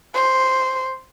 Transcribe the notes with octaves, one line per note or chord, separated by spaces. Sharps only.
C5